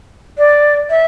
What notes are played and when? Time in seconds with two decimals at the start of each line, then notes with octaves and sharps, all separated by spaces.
0.38 D5
0.90 E5